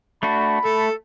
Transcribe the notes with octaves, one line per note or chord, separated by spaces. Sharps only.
A3 D4 F#4 B5
A3 A4